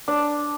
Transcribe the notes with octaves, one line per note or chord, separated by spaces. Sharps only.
D4